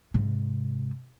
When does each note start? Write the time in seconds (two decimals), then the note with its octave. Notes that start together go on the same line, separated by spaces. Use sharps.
0.14 G#2 C3